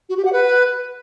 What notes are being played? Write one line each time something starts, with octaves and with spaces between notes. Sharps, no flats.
F#4
G4
F#5
B4